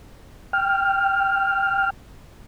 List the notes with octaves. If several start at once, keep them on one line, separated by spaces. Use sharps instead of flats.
G5 F6